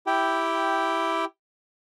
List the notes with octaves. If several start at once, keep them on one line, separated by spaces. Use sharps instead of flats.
E4 G4 G5